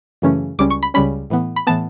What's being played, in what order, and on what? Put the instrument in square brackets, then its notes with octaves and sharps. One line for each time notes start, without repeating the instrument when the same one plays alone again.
[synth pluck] F#2 C#3 E3 A3 C#4
C#2 C#3 G3 C#4 D6
C#6
B5
C#2 C#3 G3 C#4 B5
A2 E3 B3
B5
A2 E3 B3 A5